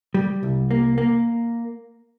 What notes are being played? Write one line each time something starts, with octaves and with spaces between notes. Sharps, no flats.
G3
C2
A#3
A#3